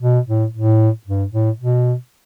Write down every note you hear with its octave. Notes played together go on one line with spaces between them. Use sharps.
B2
A2
A2
G2
A2
B2